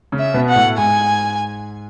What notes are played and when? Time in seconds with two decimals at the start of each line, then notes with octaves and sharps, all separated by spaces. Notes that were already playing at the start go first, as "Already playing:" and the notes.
0.12 C#3 C#4
0.19 E5
0.34 B2 B3
0.49 F#5
0.56 A2 A3
0.77 G#2 G#3 G#5